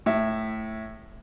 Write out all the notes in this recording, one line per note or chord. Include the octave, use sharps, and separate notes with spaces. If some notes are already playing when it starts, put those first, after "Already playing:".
A2 E5